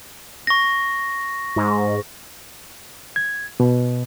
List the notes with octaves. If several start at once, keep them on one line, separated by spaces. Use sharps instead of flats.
C#6 A#6
G#2
G#6
B2